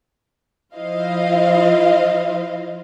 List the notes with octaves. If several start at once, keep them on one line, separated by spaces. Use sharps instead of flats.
F3 E4 F4 C5 D#5 F5